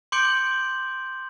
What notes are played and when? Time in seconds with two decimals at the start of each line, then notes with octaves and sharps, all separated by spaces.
0.12 C6 D6 G6 C#7 D7 F#7